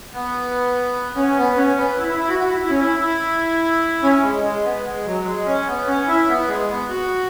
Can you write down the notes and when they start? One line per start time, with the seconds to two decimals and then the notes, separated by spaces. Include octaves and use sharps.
0.14 B3
1.16 C#4
1.37 B3
1.57 C#4
1.78 B3
1.98 E4
2.08 E4
2.19 E4
2.28 F#4
2.39 F#4
2.49 E4
2.60 E4
2.69 C#4
2.80 E4
3.00 E4
4.03 C#4
4.23 G#3
4.44 G#3
4.64 B3
4.85 G#3
5.05 F#3
5.25 G#3
5.46 C#4
5.67 B3
5.87 C#4
6.08 E4
6.28 B3
6.48 G#3
6.69 B3
6.89 F#4